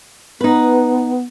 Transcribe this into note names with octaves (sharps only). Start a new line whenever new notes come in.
B3 D#4 B4